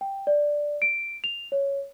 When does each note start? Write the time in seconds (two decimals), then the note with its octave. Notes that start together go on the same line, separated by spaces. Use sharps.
0.01 G5
0.27 D5
0.82 D7
1.24 F7
1.52 C#5